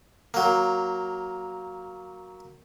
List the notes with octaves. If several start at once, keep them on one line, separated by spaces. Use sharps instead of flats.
F#3 A#3